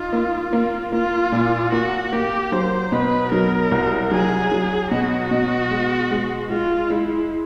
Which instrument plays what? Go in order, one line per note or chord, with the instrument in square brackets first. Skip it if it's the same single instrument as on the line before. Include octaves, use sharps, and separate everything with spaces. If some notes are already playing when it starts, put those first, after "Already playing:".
Already playing: [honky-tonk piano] D#4 [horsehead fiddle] F4
[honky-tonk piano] A#3
A#3
[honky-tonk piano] A#3 [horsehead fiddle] F4
[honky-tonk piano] A#2
[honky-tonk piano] A#3 [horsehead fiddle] F#4
[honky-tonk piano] A#3 [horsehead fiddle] G4
[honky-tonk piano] F#3 [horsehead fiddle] C5
[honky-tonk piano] B2 [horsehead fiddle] B4
[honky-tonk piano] F#3 [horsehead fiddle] A#4
[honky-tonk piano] C2
[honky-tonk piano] F#3 [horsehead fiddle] G#4
[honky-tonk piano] F#3
[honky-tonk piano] B2 [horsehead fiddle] F#4
[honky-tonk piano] B2
G#3
G#3
[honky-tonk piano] G#3 [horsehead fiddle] F4
[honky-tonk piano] G#3 [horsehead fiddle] E4